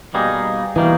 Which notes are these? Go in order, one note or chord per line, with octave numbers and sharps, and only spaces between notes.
B2 G3 A#3 D#4 G#4
B2 E3 G3 A#3 D#4 G#4